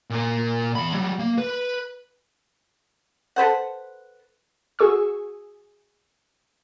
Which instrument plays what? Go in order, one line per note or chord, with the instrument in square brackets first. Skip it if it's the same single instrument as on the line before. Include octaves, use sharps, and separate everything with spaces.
[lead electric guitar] A#2 A#4
E2 B5
F#3 G3
A#3
B4
[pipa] A4 B4 C5 F#5
[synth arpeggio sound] F#4 G#4 C#6 E6